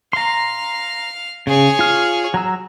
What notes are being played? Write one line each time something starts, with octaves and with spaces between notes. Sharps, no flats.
F5 A#5 C6
C#3 G#4 C#5
F4 F6
F#3 A#5 E6